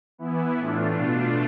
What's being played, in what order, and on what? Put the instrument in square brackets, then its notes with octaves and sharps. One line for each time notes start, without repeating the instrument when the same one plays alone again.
[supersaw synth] E3 B3 E4
A2 E3 A3 D4 F4
B2 A3 D4 F4